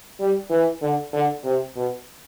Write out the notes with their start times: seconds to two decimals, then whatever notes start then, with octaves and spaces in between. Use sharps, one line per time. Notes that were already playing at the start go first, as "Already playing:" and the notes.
0.20 G3
0.50 E3
0.82 D3
1.14 D3
1.45 C3
1.76 B2